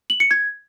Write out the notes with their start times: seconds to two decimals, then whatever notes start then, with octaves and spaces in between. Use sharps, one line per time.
0.10 F#7
0.20 C#7
0.31 G#6